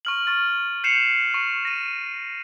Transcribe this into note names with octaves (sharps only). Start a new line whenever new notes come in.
C#6 F6 F#7
C#6 F6 A6
G6 C7 C#7 E7 F7
C#6
A#6 D#7